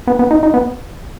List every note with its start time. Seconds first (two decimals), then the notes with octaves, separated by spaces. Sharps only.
0.07 B3
0.19 B3
0.31 D#4
0.43 D#4
0.54 B3